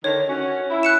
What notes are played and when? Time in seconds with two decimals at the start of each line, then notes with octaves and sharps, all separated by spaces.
0.04 D3 D#3 C#5
0.28 C#4 F#4
0.70 E4
0.83 F#6 C#7 E7